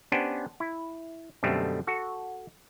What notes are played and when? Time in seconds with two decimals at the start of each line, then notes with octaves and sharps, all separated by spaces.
0.12 B3 C#4 D4 G4 B4 C5
0.60 E4
1.43 F#2 B2 D3 G3 A3 C4
1.87 F#4 A4